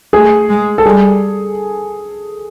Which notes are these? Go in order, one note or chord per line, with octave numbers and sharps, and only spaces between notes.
A3 G#4
G#3
A4
G3 G#4